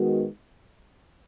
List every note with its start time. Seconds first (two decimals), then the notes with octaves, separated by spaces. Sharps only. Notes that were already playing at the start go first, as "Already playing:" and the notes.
Already playing: D#3 G#3 B3 F#4